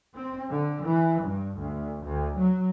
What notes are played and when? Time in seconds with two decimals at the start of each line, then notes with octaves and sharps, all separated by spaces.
0.14 C4
0.50 D3
0.85 E3
1.22 G2
1.57 D2
2.05 D2
2.38 F#3